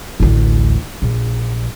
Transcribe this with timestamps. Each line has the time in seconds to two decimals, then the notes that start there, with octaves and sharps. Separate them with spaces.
0.20 A1 D2
1.02 A#1